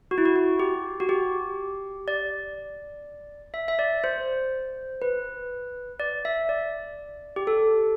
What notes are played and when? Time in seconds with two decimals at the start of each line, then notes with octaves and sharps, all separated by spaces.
0.11 F#4
0.18 E4
0.25 F#4
0.36 F#4
0.60 G4
1.00 F#4
1.09 G4
2.08 D5
3.54 E5
3.68 E5
3.79 D5
4.04 C5
5.02 B4
6.00 D5
6.25 E5
6.49 D5
7.36 G4
7.47 A4